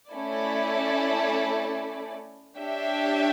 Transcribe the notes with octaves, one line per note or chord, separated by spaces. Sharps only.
A3 C#4 E4 A4 D5
D4 G4 C#5 E5 G5